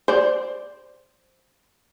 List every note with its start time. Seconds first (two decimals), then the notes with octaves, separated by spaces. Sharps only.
0.08 C5 D5